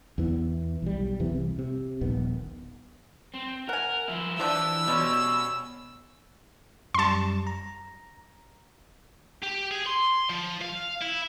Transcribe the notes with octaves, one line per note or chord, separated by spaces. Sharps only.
E2 E3 B3
B1 G3
E2 C3 E3
C2
C3
D#1 A#1 D#3 B3
C4
A#4 F#5 G#5
F3 E4
E3 F3 D4 G4 E6
B2 G3 G#3 C#4
F#2 G3 A5 C6
A#5
G4
G#4
C6
F3
F5
E4